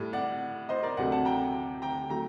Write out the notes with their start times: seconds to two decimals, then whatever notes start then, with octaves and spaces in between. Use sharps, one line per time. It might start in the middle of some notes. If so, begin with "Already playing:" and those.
Already playing: A2 G3
0.13 D5 F#5
0.69 C5 D#5
0.83 A#4 D5
0.97 D2 C3 F#3 A3 D5 F#5
1.12 F#5 A5
1.25 G5 A#5
1.82 G5 A#5
2.10 F#3 A3 G5 A#5